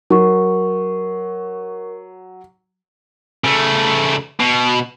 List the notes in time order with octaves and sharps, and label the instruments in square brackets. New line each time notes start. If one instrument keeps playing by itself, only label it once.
[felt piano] F#3 [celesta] A#4 C#6
[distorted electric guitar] C#3 A3
B2